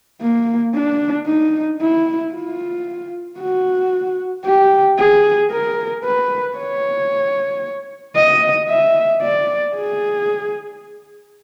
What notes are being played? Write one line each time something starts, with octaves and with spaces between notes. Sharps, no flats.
A#3
D4
D#4
E4
F4
F#4
G4
G#4
A#4
B4
C#5
D#5
E5
D5
G#4